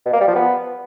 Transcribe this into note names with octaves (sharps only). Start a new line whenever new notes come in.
B2
A#3
G3
F3
B3